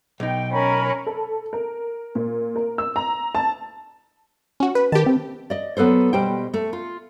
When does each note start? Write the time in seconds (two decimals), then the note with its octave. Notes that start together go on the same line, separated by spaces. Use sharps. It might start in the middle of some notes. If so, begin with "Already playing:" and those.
0.20 B1 D#4 G5
0.52 C#4 A#4 B5
1.07 A4
1.53 A#4
2.15 A#2
2.56 A#4
2.78 E6
2.96 A#5
3.35 A5
4.60 C#4 F#4
4.75 B4
4.92 D#3 G4 A5
5.06 C4
5.50 D5 D#5
5.77 F#3 B3 A4 B4 C5
6.13 B2 G3 G4 C5 G5
6.54 A3
6.73 F4